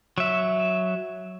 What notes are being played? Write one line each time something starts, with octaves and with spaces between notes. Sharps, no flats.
F#3 E5